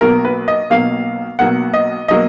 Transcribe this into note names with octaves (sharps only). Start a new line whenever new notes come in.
B1 B2 F#3 A#3 A#4
B4
D#5
B1 B2 F#3 A#3 F5
B1 B2 F#3 A#3 F#5
D#5
B2 F#3 A#3 D#5